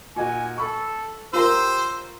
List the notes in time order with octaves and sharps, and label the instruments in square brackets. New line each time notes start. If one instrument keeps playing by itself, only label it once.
[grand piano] A#2 D#4 F#4 [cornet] G#5
[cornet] A4 [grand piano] B5 C#6
[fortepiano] F4 A#4 [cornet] G4 [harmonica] C5 E6